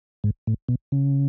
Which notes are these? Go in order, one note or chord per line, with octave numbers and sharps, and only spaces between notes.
G#2
A2
B2
C#3